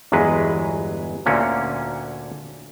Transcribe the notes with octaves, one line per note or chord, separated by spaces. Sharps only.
G1 E2 F#3 G#3 B4
D2 A#2 D3 A#3 C#4